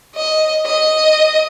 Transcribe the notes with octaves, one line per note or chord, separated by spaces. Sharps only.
D#5
D#5